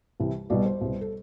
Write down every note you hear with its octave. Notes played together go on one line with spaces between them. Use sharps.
C2 C3 E3 G3
C2 B2 G3 D5
C5
C2 B2 G3
A4